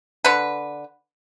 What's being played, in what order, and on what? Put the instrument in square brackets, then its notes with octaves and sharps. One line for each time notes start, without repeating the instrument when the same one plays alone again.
[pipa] D3 B4